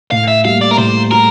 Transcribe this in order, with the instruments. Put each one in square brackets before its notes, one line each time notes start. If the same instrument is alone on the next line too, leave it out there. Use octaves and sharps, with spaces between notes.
[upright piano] A2 [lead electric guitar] F5
[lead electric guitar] E5
[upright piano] G3 A#3 [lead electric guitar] F5
[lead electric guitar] D5
A#4
[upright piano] A2 [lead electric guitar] C5
[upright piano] G3 [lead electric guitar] A#4